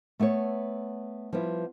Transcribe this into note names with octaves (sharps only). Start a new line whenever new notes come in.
A3 B3 A4 C#5
F3 G3 B3 E4